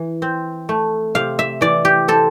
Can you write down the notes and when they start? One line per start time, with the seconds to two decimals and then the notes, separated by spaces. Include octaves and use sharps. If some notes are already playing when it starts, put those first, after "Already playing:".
Already playing: E3
0.22 C4
0.69 A3
1.15 C3 F5
1.39 E5
1.61 E3 D5
1.85 G4
2.08 C4 A4